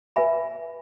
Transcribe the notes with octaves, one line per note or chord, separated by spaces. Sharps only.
B4 E5 G#5 B5